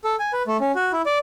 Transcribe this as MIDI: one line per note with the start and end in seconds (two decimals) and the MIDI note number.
0.04 0.16 69
0.19 0.32 80
0.33 0.43 71
0.47 0.57 57
0.61 0.72 61
0.75 0.92 66
0.93 1.02 64
1.06 1.18 74